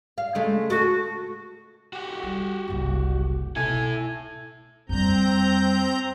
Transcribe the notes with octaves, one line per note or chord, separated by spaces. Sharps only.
F5
C#3 G#3 A3
F#4 A4
F#4 G4
G3
F#1 C2
B2 D#4 E4 A4 G#5
F2 G3 C4 A#5 G6